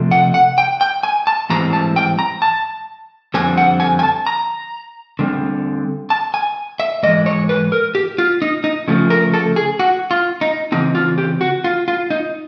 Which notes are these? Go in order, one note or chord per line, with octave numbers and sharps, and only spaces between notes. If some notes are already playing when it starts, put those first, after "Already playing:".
Already playing: C3 F3 A3 C4
F#5
F#5
G5
G5
G#5
A5
G#2 E3 G3 C4 A#5
A5
G5
A#5
A5
F2 D3 G3 C4 G#5
F#5
G#5
G#5
A5
A#5
D3 G3 C4
A5
G#5
E5
G#2 E3 G#3 D#5
C#5
B4
A#4
G4
F4
D#4
D#4
C#3 F3 A3
A#4
A4
G#4
F#4
F4
D#4
C#3 E3 C4 D#4
F4
G4
F#4
F4
F4
D#4